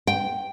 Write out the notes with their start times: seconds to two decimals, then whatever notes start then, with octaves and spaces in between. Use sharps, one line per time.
0.07 G5